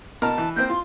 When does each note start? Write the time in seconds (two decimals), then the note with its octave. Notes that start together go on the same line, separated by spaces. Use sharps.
0.22 B2 A#4 A5 F6
0.38 E3
0.56 A#3 C4 C5 G6
0.69 F4 C6